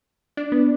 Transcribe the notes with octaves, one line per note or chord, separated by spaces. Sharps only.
D4
B3